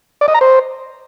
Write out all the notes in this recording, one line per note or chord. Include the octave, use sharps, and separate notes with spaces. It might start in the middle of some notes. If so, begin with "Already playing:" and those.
D5
D#5
A#5
C5